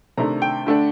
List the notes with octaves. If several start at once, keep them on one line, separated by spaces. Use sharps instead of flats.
C3 D#3 A3 D4 A#5
G5
D3 A3 D4